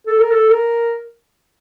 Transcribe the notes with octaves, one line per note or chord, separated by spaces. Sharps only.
A4
A#4
A4
A#4